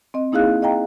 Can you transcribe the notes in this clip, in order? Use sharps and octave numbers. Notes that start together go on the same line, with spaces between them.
C4 D#5
A#3 D#4 E4 G#4 F5 F#6
D#5 F5 G5 A#5